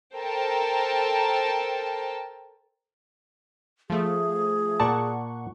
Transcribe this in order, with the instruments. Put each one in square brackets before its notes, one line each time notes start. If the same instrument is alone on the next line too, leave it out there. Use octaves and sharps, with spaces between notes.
[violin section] A4 A#4 C5 G5 A5
[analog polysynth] F3 A3 [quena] G#4
[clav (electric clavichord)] A#2 D5 A5 [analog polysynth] F#5 C#6